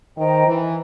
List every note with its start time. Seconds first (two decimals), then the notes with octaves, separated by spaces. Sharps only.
0.17 D#3 C5 D#5 G5 A#5
0.47 E3